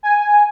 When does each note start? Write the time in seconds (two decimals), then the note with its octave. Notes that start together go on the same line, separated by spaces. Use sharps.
0.03 G#5